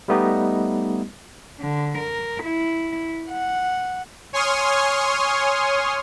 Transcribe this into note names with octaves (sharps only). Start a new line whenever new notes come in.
G3 A3 B3 D#4 G4 D#5
D3
A#4
E4
F#5
C#5 G#5 C6 C#6 D#6 F6